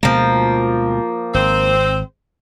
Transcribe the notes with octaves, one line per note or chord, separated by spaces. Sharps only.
D2 B2 F3 G#3 A#3
G#1 C4 C5